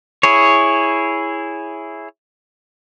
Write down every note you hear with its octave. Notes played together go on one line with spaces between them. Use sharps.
E4 G#4 C#5